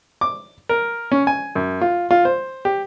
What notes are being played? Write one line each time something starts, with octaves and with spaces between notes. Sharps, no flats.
D6
A#4
C#4
G#5
F#2
F4
F4
C5
G4